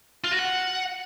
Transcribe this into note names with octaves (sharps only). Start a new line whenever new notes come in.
F4
F#4
F#5